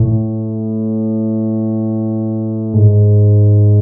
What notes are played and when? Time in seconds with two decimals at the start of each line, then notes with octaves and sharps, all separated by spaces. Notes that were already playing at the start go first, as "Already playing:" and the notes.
Already playing: A2
2.74 G#2